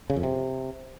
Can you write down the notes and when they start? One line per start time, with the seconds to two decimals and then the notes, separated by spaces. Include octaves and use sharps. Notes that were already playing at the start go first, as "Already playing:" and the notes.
0.10 C#3
0.16 F2
0.23 C3